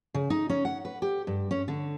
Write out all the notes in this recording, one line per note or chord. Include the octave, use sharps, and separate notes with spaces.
C#3
D#4
C#4
F#5
B4
G4
G2
C#4
D3